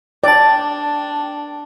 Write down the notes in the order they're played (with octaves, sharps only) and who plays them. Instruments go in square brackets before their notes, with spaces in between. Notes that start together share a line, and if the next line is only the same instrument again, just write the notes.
[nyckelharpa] D4 [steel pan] D5 [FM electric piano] G5 A5